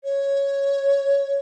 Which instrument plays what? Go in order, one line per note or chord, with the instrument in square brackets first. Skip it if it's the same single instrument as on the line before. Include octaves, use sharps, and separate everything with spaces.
[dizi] C#5